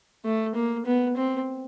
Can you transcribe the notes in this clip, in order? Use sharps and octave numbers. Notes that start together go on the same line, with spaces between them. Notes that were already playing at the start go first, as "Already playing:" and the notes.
A3
A#3
B3
C4